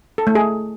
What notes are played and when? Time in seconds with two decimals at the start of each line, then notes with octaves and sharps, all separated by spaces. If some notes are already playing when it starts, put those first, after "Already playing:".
0.18 A4
0.27 A3
0.35 G#4